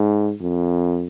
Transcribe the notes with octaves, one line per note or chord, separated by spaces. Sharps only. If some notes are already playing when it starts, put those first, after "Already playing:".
Already playing: G#2
F2